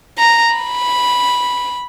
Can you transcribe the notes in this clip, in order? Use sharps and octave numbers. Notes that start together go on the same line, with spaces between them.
A#5
B5